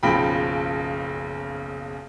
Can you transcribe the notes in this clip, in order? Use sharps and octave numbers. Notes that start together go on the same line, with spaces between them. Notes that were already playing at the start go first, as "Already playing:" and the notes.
F#1 B1 C#3 F3 G5 B5